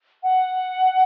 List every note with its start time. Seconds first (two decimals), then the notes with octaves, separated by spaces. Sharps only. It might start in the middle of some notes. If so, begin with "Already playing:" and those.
0.23 F#5